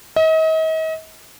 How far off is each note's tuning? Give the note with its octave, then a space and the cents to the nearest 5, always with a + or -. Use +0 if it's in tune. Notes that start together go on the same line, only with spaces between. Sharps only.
D#5 +40